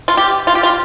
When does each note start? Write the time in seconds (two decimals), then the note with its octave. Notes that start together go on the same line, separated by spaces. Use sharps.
0.08 F4
0.17 G4
0.47 F4
0.55 G4
0.63 F4